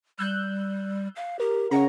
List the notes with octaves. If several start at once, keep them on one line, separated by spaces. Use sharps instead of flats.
G3 E6 F#6 G6
F5
G4 A#4
C#3 C#5 F#5 A#5